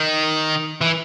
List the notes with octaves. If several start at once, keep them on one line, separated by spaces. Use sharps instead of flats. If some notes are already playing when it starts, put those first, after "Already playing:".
Already playing: D#3
E3